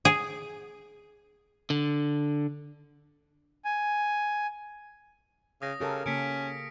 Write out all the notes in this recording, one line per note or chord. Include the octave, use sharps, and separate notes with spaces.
G#4
D3
G#5
C#3 D#6 A#6
C#3 G4 A4 A#4
C#3 A#3 C#4 B6 C#7 D7